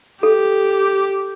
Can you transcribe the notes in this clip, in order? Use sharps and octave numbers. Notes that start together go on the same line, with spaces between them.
G4 A4